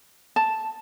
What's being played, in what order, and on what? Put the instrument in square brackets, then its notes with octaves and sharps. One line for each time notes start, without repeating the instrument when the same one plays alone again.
[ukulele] A5